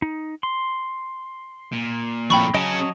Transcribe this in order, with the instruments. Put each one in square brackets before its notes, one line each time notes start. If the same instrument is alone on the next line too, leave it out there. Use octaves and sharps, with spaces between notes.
[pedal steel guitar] D#4
C6
[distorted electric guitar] A#2
[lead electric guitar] F2 A2 [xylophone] G5 B5 C#6
[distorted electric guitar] F#3 [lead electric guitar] C#4 G#4 [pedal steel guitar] D#5 A5 D#6 [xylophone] D7